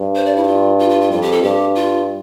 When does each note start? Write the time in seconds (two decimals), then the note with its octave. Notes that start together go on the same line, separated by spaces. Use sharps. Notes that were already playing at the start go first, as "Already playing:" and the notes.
Already playing: G2
0.16 C5
0.26 D5
0.36 E4
0.43 G4
0.47 F4
0.79 F4
0.90 F4
1.01 F4
1.11 F2 F4
1.22 G4
1.32 A4
1.43 G2 G4
1.75 F4